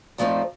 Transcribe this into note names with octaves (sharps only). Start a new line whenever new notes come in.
A#2 F3 A3 C4 D#4